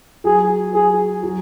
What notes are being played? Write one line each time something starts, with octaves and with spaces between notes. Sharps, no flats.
F#3 G#4
F#3 G#4
F#3